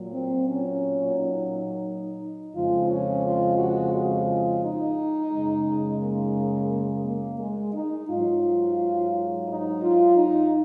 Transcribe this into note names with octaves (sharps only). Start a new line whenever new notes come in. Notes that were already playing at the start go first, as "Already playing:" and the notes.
Already playing: A#2 F#3
C4
C#4
D#4
F2 C#3 F3 G#3 F4
C#4
F4
F#4
F4
D#4
F#2 C#3 G#3
A#3
A#3
A#3
G#3
D#4
G#2 F#3 F4
D#4
F4
D#4